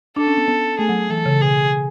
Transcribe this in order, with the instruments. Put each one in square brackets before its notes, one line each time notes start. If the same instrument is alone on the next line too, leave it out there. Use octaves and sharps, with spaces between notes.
[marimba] D4 [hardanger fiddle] A4
[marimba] C#4
B3
B3
[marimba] A3 [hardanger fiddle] G#4
[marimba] F#3
[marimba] E3 [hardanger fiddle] A4
[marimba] C#3
[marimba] B2 [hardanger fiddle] G#4